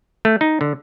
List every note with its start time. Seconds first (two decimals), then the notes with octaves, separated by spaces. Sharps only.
0.25 A3
0.41 D#4
0.61 D3